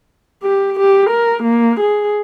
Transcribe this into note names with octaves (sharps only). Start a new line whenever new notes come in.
G4
G4
A#4
A#3
G#4